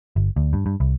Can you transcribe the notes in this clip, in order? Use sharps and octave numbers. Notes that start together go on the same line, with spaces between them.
G1
D2
G2
G2
C2